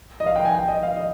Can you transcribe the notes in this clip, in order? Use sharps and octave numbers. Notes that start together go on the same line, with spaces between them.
D#5
F5
G5
G#5
G5
D#5
F5
D#5